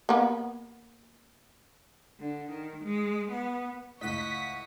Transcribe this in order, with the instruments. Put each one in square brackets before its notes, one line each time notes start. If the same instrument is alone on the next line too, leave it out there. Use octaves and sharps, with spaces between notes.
[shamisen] A#3 B3
[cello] D3
D#3
G#3
B3
[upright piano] C#2 A2 [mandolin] D#5 F#5 [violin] C#6 D#6 [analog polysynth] B6